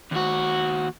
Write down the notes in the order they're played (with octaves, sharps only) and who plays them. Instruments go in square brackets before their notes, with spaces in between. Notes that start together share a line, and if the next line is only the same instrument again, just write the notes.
[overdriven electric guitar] D#2 F#4